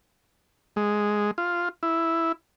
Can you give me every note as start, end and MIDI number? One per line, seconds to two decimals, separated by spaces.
0.76 1.31 56
1.38 1.69 65
1.83 2.32 64